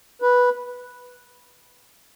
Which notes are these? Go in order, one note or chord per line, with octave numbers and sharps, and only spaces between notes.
B4